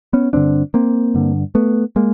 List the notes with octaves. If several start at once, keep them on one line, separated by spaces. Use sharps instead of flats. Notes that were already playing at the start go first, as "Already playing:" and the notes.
B3 C#4
G2 D3 C4 D4
A#3 C4
G2 D3
A3 B3
G#3 A#3